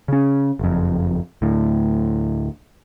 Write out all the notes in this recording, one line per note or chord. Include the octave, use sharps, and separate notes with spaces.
C#3 C#4
F#1 F2
D2 A2